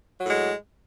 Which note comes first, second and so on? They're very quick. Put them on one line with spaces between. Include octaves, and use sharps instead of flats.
F#3 A2 G#3